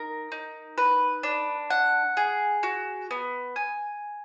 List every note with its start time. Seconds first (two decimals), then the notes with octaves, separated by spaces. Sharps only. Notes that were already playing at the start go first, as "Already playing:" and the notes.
Already playing: D#4 A#4
0.32 D#4
0.78 B4
1.23 D4
1.70 F#5
2.17 G#4
2.63 F#4
3.11 B3
3.56 G#5